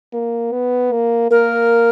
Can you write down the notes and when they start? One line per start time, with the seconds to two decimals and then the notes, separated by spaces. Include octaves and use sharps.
0.13 A#3
0.52 B3
0.92 A#3
1.31 A#3 A#4